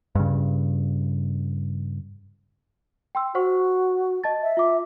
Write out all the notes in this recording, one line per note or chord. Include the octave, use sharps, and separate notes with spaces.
G2 C#3
G5 C6 E6
F#4 C5 F#5 C#6
D#5 A5 A6
E5
F4 D6